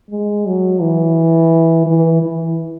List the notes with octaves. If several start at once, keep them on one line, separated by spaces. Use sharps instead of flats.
G#3
F#3
E3
E3
E3